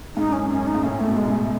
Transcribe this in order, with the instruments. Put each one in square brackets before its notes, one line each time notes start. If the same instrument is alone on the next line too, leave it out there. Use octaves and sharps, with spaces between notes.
[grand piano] G#2 [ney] D#4
[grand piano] F#2 [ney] C#4
[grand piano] F#2 [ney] C#4
[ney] D#4
[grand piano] G#2
[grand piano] A2 [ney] C#4
[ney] A3
[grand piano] B2
[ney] G#3
[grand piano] C#3
[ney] A3